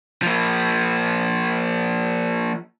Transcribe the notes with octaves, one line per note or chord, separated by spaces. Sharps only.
F3 A#3